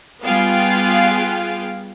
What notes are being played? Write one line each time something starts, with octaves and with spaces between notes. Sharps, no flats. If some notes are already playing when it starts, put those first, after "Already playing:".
G3 B3 F4 G#4 F5 G5